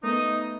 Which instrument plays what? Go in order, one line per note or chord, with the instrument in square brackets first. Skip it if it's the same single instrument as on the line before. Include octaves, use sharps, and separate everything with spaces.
[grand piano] A3 B3 [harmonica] D#4 D#5